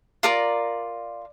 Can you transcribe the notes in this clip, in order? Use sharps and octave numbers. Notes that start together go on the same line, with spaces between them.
F4 A#4 D5 D6